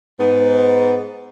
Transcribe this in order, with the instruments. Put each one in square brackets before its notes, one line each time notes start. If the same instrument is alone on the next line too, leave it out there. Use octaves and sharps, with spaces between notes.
[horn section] G#2 B3